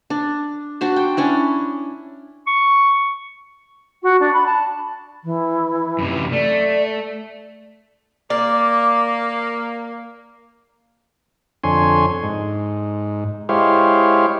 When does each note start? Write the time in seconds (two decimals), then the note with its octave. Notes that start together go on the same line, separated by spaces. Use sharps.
0.10 D4
0.81 D4 F#4 C5
0.96 G5
1.17 C#4 D4 E4
2.47 C#6
4.02 F#4
4.20 D4
4.33 B5
4.46 A5
5.24 E3
5.99 F#2 C3
6.32 A3 D5
8.30 A#3 D5
11.64 F2 D3 C#5 G#5 C6
12.23 G#2
13.49 G#3 E4 G4 C5 C#5 F5